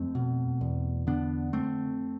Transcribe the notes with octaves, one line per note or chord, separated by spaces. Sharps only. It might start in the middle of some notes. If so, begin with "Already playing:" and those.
Already playing: F2 A3 C4
B2
E2
D3 B3 D4
F2 A3 C4